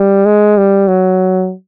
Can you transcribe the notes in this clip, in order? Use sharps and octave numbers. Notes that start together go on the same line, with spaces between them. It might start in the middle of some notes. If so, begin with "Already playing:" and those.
Already playing: G3
G#3
G3
F#3